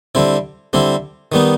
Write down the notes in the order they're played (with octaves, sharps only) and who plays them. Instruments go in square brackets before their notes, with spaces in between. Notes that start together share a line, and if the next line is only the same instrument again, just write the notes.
[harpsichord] D3 G3 C4 E4
D3 G3 C4 E4
D#3 G3 B3 D#4